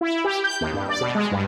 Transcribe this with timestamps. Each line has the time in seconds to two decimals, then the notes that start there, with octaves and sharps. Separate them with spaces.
0.01 E4
0.24 G4
0.44 G6
0.61 D#2
0.73 G2
0.89 D5
1.01 B2
1.15 G#3
1.32 G2